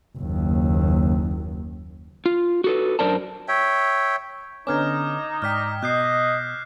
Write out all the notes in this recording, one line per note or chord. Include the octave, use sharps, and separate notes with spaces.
F#1 D#2
F4
F#4 A4 B4
F#2 D4 A#4 C5 D5 A5
C#5 E5 G5
D3 B3 C#4 D#4 D6 F6 G#6
G#2 D5 G5 F6 B6
B2 D#5 F#6 G6 C7